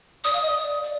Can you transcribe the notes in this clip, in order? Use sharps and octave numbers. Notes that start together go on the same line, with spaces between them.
D5 D#6
F5
D#5
D5
D5